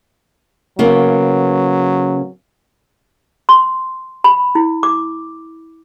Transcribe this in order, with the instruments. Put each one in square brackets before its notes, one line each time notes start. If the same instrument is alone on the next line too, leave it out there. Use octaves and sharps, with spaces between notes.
[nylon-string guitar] C#3 A#3 B3 [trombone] F#3
[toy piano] C6
B5
E4
D6